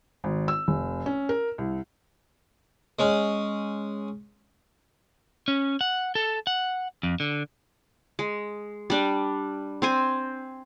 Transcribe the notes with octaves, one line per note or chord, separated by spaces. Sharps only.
G#1
E6
F1
C#4
A#4
C2
G#3 C#4
C#4
F#5
A4
F#5
F2
D3
G#3
G3 D4
C4 C5 G#5